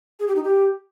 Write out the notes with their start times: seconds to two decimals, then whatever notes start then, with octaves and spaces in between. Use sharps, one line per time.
0.20 G#4
0.28 G4
0.36 D#4
0.44 G4